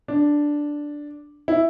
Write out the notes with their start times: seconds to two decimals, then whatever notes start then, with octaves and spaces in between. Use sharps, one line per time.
0.08 D4
1.48 E4